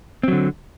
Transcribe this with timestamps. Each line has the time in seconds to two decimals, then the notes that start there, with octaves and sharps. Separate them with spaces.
0.24 C4
0.28 F#3
0.32 D3